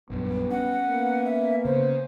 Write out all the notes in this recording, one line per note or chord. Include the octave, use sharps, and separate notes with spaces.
A#1 F#2 G3 B3
C#4 F#5
A#3 B3
E5
C#3 C5